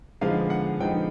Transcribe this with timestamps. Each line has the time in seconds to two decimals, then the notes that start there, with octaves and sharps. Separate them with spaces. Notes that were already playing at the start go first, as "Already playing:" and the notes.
0.21 D3 F3 G#3 B3 D#4 F5
0.50 F#5
0.79 D3 F3 G#3 B3 D#4 G5